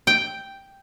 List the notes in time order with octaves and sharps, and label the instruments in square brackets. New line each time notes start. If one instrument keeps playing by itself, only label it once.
[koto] G5